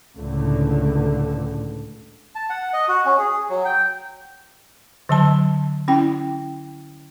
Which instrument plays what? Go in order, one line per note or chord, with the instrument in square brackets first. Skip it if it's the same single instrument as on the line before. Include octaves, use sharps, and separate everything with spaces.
[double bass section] C#2 A2 D3
[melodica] A5
F#5
D#5
F#4
C#4
G#4
F#3
G5
[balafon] D3 F#3 A5
C#4 E4 G5